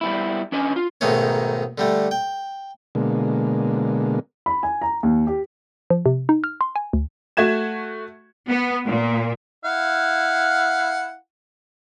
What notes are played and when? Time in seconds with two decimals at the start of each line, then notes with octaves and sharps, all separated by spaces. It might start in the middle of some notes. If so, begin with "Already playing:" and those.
0.01 G3 B3 E4
0.52 C#4 D4 B4 D#5 G#5
0.76 F4
1.01 B1 G#2 D#3 A3 C#4 C#5
1.78 D3 G3 A3
2.11 G5
2.95 B2 D3 G#3 A#3
4.46 B5
4.63 G#5
4.82 A#5
5.03 D#2
5.27 G4
5.90 F3
6.06 C3
6.29 D#4
6.44 F6
6.61 C6
6.76 G#5
6.93 D2
7.37 A3 F#4 G#6 E7
8.48 B3
8.85 A#2
9.65 E4 F5 F#5